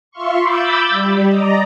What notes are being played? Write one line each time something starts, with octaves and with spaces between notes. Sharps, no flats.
F4 E5 F5 C6 C#6
B5 D6 E6 G6 A6
G3
D5 D#5 A#5